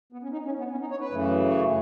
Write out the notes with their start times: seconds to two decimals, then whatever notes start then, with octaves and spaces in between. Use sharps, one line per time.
0.12 B3
0.23 C#4
0.32 D#4
0.45 C#4
0.59 B3
0.71 C#4
0.81 D#4
0.91 C#5
1.01 B4
1.11 F#2 C#3 E3 A3
1.49 C#5